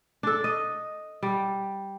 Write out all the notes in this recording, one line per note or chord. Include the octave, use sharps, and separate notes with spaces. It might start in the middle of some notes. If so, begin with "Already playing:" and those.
D4 A4
D#5
G3